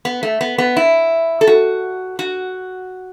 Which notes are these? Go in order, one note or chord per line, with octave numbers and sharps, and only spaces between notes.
B3
A3
B3
B3
E4
A4
F#4
F#4